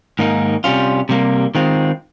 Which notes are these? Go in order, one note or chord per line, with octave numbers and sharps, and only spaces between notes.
G#2 D#3 A#3 D#4
C3 G3 C#4 F4
C3 G3 A#3
D#3 G#3 C4 F4